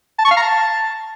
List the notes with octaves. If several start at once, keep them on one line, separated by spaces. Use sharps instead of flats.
A5
C#6
F5
A#5
A5